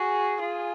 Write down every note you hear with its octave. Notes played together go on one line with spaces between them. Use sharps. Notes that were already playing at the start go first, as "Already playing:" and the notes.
Already playing: F#4 G#4
F4